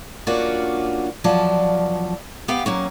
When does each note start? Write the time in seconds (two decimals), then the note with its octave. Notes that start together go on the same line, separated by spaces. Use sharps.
0.27 A#3 C#4 D4 F4 F#4
1.24 E2 F3 F#3 F4 D5 A5
2.48 B3 G4 F5 G5
2.66 F#3 A#3 C#4